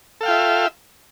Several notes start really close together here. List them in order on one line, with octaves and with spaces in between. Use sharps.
A4 F5 G5 F4 E5